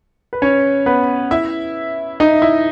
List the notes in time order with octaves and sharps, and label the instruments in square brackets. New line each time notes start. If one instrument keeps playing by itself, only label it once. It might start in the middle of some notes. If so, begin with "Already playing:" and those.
[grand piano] B4
C#4 C#5
B3 B4
E4 E5
D#4 D#5
E4 E5